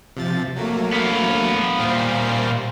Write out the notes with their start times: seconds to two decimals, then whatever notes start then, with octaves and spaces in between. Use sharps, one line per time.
0.17 C3 F3 A6
0.56 F#3 A3 A#3
0.93 B3 F5
1.79 A#2 G3 C5 F5